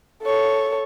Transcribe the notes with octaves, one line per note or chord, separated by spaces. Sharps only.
A4 C#5